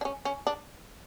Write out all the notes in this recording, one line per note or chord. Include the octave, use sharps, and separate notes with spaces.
D4
C#4
C#4
D4